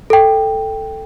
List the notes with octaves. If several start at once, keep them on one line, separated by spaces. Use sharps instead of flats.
A4 G5